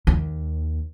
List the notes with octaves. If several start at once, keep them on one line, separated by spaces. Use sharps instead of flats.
D#2